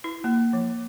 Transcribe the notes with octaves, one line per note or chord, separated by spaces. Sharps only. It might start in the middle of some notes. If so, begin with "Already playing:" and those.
E4
A#3
F3